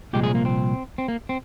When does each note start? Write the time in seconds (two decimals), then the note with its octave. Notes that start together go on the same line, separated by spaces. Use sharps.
0.13 C2 A#2 F3 G#3 G4
0.24 G#4
0.35 A#3
0.45 C4
0.98 C4
1.08 A#3
1.29 C4